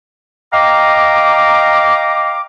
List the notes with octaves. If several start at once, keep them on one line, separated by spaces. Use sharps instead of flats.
D#5 F5 G5 A#5 D6